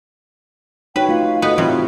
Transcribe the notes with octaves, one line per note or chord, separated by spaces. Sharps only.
D#4 F#4 B4 C#5 G5
A3 F4 F5
B3 F#4 A4 B4 D#5
A2 C3 E3 G3 F4